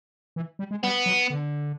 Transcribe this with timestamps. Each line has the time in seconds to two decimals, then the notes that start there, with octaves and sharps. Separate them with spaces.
0.36 E3
0.59 G3
0.71 G#3
0.83 G3 B3
1.06 F#3
1.30 D3